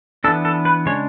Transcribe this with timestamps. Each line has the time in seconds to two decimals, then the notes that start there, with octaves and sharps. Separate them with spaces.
0.24 E3 B3 D4 A4
0.45 A4
0.65 B4
0.86 C#3 G#3 D4 C#5